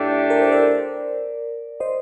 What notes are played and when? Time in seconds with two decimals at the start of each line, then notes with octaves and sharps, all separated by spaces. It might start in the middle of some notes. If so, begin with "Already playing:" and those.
Already playing: A2 A3 D4 G4
0.30 A#4
0.41 C5
0.51 A#4 D5
1.80 C5 D#5